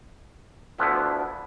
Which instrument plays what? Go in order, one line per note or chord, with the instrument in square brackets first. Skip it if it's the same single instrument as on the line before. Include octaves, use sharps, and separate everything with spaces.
[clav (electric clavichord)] D2 D3 F3 B3 E4